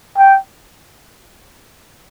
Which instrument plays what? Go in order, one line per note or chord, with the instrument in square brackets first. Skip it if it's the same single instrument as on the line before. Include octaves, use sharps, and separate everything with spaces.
[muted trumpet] G5